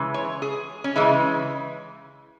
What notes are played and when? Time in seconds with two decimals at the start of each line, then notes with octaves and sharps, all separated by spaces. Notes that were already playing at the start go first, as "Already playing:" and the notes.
Already playing: C#3 E3 G#3
0.14 C#5
0.42 G#4
0.84 C#4
0.96 C#3 E3 G#3 E4